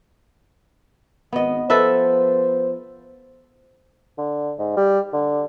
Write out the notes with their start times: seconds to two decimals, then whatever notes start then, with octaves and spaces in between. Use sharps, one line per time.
1.33 G#1 B3 D#5
1.70 F3 B3 A4 B4 C5 E5
4.18 D3
4.59 G#2
4.77 G3
5.13 D3